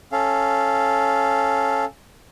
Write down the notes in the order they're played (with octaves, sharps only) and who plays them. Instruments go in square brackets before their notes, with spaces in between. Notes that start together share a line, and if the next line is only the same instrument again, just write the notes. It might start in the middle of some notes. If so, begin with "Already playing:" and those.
[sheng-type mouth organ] C#4 A4 F5